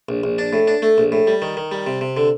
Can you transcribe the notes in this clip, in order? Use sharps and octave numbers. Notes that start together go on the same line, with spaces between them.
A#1
A#1
D4
A2
D4
A3
A#1
A2
G3
D#3
D#3
G3
C3
C3
D3